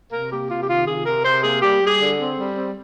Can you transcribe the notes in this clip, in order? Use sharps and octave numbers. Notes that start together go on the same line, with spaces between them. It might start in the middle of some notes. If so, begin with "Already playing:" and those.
C3 A#4
A#3 G4
C3 F4
G4
D#3 F4
C3 G#4
C3 A#4
C3 C5
A#3 G#4
G3 G4
G3
G#4
D3
C4
G3
C4